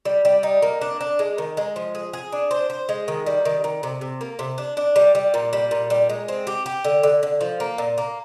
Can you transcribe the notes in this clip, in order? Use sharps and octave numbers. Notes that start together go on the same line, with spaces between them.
G3
G3
D#4
A#3
D4
D4
G#3
D#3
G#3
F3
G#4
G#4
D4
C5
C5
G#3
D#3
G3
D#3
D#3
C3
C3
A#3
C3
D4
D4
G3
G3
A#2
G3
A#2
G3
G#3
C4
G4
G4
D3
D3
D3
F3
A#3
A#2
A#3